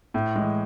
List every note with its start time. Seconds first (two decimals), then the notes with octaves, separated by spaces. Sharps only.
0.14 A2
0.36 E3 G#3